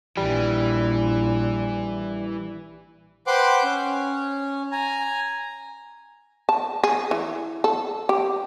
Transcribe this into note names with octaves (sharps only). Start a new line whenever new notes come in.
A#1 E3 G3
B4 C5 F#5 G5 C6 D6
C#4
G#5 A#5
A5
G#4
E3
A4
G4